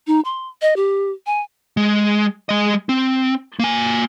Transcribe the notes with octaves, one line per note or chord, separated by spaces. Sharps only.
D#4
C6
D#5
G4
G#5
G#3
G#3 D#5
C4
A#3 G#5